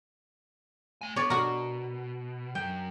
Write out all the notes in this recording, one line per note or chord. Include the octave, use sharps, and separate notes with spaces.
A3 G#5
B3 C#5 D5
B2 F#4 A#4
F#2 G5